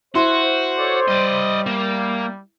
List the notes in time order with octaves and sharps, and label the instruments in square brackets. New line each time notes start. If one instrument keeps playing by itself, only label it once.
[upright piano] E4 C6 [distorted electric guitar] F#4 [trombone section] C5
[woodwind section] A4 C#5 D5
[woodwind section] G3 [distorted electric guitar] D5 D#5
[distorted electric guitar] A#3